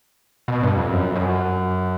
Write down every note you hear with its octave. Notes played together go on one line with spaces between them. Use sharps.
B2
G2
F2
F#2
F2
F#2